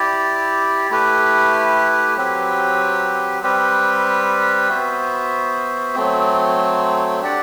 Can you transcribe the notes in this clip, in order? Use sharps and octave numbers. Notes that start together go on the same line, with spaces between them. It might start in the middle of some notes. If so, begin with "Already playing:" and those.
Already playing: E4 G4 D5
A3 E4 G4 B4
F#3 C4 G4 B4
G3 C4 G4 B4
B3 F#4 C5 E5
F#3 A3 C4
D4 G4 D5 F#5